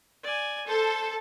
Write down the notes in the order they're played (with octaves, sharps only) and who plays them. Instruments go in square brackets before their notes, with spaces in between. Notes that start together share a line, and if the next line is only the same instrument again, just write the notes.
[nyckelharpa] D5 G#5
[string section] A4 [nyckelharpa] C5